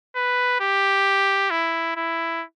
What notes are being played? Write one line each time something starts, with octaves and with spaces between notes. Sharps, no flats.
B4
G4
E4
E4